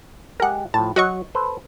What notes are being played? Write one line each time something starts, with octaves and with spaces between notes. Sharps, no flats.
G#3 G4 G#4 A#4 F#5
A2 F3 A5
F#3 F#4 C#5 D#5 F#5 C#6
A4 B4 C5